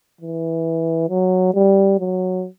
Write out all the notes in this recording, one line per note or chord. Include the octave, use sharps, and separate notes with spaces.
E3
F#3
G3
F#3